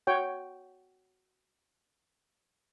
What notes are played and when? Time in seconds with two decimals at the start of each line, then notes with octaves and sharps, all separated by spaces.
0.07 F#4 C#5 G5